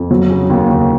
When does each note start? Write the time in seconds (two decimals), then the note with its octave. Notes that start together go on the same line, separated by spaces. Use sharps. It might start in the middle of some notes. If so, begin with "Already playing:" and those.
Already playing: F2
0.11 F#3
0.30 C#3
0.50 D#2
0.69 D#2